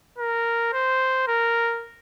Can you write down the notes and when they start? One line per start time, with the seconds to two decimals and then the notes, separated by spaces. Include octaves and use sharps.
0.19 A#4
0.73 C5
1.28 A#4